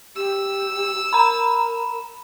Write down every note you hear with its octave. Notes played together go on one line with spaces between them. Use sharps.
G4 E6
A#4 A#5 B5